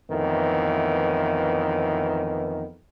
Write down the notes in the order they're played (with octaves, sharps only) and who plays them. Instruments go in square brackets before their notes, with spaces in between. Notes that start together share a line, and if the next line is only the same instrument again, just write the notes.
[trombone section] F2 A2 D#3 E3 B3